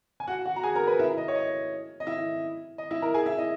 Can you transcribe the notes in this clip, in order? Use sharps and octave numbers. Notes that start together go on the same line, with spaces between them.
G#5
F#4 F#5
F#4 F#5
A#5
G#4 G#5
A#4 A#5
B4 B5
E4 E5
D#5
C#5
D#5
D#5
E4 E5
D#5
E4 E5
A#4 A#5
G#4 G#5
E4 E5
D#5